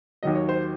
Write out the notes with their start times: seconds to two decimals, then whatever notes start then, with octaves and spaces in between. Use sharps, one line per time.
0.23 D#2 D#3 F#3 D#5
0.35 C#5
0.49 C5